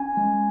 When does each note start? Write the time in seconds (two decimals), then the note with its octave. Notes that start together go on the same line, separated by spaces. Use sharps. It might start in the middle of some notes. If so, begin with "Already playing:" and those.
Already playing: C#4 G#5
0.17 G#3